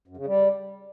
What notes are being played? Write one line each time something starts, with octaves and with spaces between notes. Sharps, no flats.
F#2
C#3
G3